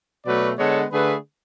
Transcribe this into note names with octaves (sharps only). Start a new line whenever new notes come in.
B2 F#3 A3 B4 D5
D3 G#3 B3 A4 C#5
D3 A3 G#4 B4